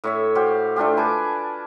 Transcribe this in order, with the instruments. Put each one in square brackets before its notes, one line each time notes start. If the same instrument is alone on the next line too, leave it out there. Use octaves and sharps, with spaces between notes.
[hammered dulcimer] A2 C#5 E5
F#4 G4 C5 F5
A3 D4 F4 G4
B4 G#5 A5 D6